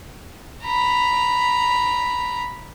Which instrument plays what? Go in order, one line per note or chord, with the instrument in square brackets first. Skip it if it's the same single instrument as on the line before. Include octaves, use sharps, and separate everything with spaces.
[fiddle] A#5 B5